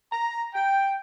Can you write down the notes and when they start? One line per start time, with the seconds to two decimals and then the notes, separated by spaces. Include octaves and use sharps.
0.12 A#5
0.54 G5